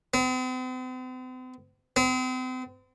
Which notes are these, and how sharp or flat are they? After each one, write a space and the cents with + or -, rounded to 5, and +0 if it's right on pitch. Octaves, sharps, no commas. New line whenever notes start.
C4 -45
C4 -40